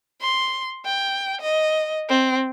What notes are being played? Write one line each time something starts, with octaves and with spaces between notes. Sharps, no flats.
C6
G5
D#5
C4